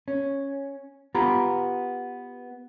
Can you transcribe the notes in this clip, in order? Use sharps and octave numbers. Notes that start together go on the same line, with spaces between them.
C#4
B3 F4 G4 G5 A#5 B5